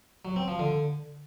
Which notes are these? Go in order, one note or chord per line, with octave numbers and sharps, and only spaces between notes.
F#3
C4
F3
D3